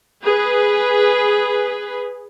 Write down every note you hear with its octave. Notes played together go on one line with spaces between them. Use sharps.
G#4 B4